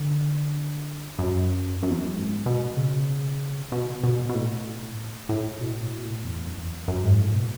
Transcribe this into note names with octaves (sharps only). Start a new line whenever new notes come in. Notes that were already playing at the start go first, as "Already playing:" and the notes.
Already playing: D3
F#2
F#2
E2
F#2
G#2
B2
C#3
B2
B2
B2
A2
A2
B2
A2
B2
A2
E2
F#2
E2
F#2
G#2
A2
B2